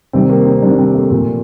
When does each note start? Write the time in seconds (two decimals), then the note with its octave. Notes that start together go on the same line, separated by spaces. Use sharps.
0.13 C3 D#3 G3 C4
0.30 A#3
0.46 C4
0.62 C3 D#3 G3 D4
0.79 C4
0.95 A3
1.11 A#2 F3